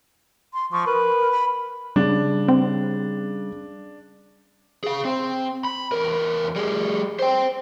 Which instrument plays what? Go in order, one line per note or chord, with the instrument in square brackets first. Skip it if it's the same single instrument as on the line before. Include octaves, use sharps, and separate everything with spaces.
[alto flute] C6
[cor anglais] F3 [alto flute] C#6
[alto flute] A#4 [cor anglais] B4
[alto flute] B5
[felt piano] C#3 [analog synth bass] G3 [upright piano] D4
[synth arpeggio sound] C4
[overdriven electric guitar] G#4 F5
C4
B5
E2 A#4
G3 G#4
C5 G5